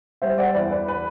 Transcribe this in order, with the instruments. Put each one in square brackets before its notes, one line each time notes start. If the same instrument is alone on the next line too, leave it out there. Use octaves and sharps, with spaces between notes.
[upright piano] G3 C5 E5
D5 F#5
E2 B4 D5
B4
B4